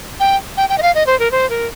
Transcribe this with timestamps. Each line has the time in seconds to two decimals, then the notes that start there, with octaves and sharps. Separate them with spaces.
0.20 G5
0.57 G5
0.69 G5
0.78 D#5
0.82 F5
0.95 D#5
1.06 C5
1.19 A#4
1.31 C5
1.50 A#4